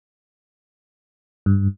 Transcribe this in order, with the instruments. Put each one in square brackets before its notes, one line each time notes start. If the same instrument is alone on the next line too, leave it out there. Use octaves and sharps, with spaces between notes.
[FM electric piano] G2